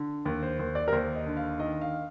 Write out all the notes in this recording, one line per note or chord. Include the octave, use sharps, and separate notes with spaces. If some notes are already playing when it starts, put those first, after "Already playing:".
Already playing: D3
D#2
C5
D#2 C5
D5
A#4
D#2 C5
D#5
D3
F5
D#3 D#5
F5